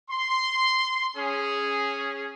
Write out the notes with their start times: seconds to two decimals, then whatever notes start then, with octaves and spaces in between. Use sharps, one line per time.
0.10 C6
1.17 C#4 G#4